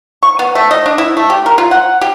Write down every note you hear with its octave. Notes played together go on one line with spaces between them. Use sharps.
C#6
B3
A3
D#5
D4
E4
A3
G4
A#4
F4
F#5
G4